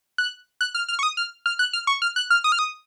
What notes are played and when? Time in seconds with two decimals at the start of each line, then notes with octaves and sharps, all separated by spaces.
0.18 F#6
0.61 F#6
0.75 F6
0.88 F6
0.99 C#6
1.03 D#6
1.17 F6
1.46 F6
1.59 F#6
1.73 F6
1.87 C#6
2.02 F6
2.16 F#6
2.30 F6
2.44 D#6
2.52 F6
2.59 D#6